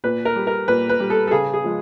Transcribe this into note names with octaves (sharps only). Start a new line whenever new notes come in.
A#2 B4
A#4
G3
A#4
A#2 B4
B4
G3
A4
A4
C#3 G#4
G#4
F3 G#3